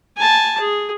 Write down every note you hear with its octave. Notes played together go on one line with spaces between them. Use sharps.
G#5 A5
G#4